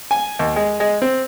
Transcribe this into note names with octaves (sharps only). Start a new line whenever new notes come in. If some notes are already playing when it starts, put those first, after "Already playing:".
G#5
D#2
G#3
G#3
C4